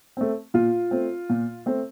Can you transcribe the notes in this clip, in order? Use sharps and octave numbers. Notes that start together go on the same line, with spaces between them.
A3 C4
A#2 F4
A3 C4
A#2
A3 C4